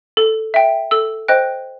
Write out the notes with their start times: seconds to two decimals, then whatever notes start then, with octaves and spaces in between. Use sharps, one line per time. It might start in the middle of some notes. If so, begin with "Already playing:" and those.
0.17 A4
0.54 E5 G5
0.91 A4 E6
1.28 C5 D#5 G5 F#6